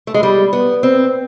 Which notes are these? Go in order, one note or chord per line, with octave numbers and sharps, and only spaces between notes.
A3
G#3
G3
B3
C4